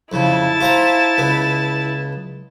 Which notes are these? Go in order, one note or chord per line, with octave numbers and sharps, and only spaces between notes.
F2 C#3 E4 A5
F4 C5 A#5
C#2 B3